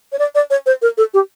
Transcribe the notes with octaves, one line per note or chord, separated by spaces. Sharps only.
C#5
D5
D5
C#5
C5
A#4
A4
G4